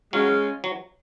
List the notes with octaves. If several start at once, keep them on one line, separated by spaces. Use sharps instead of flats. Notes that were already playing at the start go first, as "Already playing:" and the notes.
C#3 F#3 G#3 C#4 F4
F#3